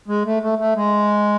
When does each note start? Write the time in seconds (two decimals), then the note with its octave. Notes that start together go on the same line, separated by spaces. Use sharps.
0.08 G#3
0.26 A3
0.43 A3
0.59 A3
0.76 G#3